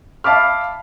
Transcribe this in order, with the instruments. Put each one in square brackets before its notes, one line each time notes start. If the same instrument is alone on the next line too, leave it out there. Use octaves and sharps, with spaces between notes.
[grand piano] E5 F5 A5 B5 D6 F6